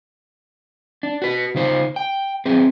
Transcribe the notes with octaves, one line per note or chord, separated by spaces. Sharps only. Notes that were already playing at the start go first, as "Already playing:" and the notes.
D4
F#4 B4
C#3 D#4 C5
G5
C4 G#4 B4